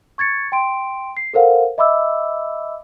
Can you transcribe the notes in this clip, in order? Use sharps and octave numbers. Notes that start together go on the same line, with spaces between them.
C#6 G#6 A6 C#7
G5 C6 D7
C7
A4 A#4 C5 F5 F#5
D#5 E5 B5 D6 E6